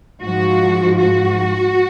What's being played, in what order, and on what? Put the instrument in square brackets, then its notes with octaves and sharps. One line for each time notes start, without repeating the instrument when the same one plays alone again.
[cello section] G#2 F3 F#4
F#4